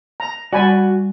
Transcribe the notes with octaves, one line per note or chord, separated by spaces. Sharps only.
A#5
G3 F#4 D5 G#5 B5